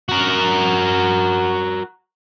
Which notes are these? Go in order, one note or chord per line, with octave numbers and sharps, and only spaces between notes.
F#4 A#4